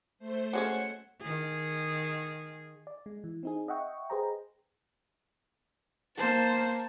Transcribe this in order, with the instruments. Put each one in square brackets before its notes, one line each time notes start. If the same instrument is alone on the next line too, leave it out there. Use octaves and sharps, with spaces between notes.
[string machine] A3 C5
[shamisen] F#3 G#3 C#4 [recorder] C#5 [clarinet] F#5
[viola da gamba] D#3 G#4
[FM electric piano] D5
G#3
E3
C4 D#4 G#4
D#5 E5 F#5 G5 C#6
G#4 B4 C5 D#5 G5 A#5
[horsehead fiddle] A#3 C5 [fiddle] A5